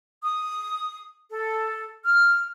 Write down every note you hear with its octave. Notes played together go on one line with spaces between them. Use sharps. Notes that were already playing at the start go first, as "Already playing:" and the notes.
D#6
A4
F6